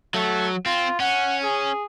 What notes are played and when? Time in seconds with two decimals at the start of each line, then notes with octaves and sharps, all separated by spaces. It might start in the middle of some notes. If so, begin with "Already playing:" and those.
0.14 F#3 A3
0.66 C4 F4
1.00 C#4 F#5
1.43 G#4